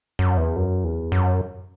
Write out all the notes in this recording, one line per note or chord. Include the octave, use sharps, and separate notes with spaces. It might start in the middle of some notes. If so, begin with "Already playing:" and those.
F#2
E2
F#2
E2
F#2